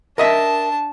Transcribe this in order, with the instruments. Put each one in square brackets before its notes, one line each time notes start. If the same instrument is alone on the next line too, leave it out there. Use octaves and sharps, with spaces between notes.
[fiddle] D4 A5 [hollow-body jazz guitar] A#4 D#5 E5